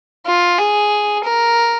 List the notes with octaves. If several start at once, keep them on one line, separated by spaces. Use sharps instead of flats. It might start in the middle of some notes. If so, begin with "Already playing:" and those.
F4
G#4
A#4